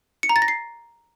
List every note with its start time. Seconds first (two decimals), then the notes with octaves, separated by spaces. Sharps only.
0.23 C#7
0.29 A#5
0.36 A6
0.42 A#6
0.48 C7